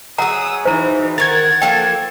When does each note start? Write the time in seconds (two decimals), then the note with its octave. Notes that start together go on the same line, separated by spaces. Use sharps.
0.18 F#3 G#4 F#5 A#5 D#6 E6
0.65 E3 D#4 C5 A#5
1.18 D#3 A#4 F#5 G#6 A6
1.62 F3 A#3 A4 G5